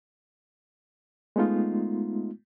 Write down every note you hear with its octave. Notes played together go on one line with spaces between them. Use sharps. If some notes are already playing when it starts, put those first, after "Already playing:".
G#3 A3 B3 D#4 F4